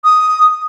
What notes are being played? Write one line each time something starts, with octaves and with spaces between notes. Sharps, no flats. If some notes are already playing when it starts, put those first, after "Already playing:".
D#6